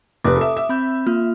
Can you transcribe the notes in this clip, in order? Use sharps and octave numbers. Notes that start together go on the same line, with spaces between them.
F1 B4 D6 D#6
A4 E5
E5
C4 B5 G6
A#3 F4 F6